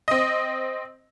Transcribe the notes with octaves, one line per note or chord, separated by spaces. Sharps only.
C4 D#5